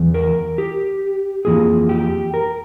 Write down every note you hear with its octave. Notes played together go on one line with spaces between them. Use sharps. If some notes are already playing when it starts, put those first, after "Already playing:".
Already playing: E2 E3
A#4
G4
F2 E3 A#3 F4 G#4
G4
A#4